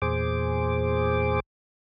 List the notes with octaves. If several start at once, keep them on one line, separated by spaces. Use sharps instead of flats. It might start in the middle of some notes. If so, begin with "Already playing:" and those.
E2 A#2 G#4 C5 D6